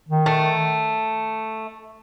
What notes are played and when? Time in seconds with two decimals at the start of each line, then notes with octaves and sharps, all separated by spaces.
0.09 D#3
0.26 A3